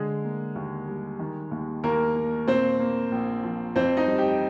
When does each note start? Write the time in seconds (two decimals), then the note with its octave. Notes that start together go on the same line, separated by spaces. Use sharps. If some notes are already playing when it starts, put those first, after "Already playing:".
Already playing: D3 G#3 G#4
0.24 A#3
0.56 D#2
0.88 G3
1.19 D#3
1.51 D#2
1.84 D#2 A#3 A#4
2.16 A#3
2.47 A#2 C4 C5
2.79 A#3
3.12 A#1
3.43 F3
3.76 F2 C4 C5
3.97 D#4 D#5
4.08 G3
4.18 G4 G5